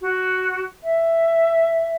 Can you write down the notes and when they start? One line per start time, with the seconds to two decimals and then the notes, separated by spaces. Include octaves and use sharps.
0.01 F#4
0.83 E5